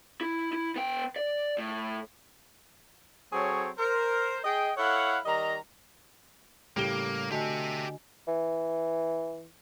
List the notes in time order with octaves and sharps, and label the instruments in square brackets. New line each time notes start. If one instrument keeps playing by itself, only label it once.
[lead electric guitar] E4
E4
B3 G5
D5
A2
[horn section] F#3 C4 G#4 A4 C#5
A#4 C5
G#4 D#5 G5
E4 A4 C#5 F5 F#5
D#3 G3 D#5 A#5
[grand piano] A2 G4 G7 [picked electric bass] C#3 G3 [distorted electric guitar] A#3
[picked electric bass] D3 [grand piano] A3 [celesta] F#4 D#5 G#5 [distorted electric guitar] G4 E5
[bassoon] E3